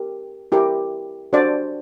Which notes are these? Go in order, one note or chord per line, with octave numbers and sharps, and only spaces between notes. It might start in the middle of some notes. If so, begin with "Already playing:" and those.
Already playing: G4 A#4
E4 G4 A#4
D4 F#4 A4 C5 D5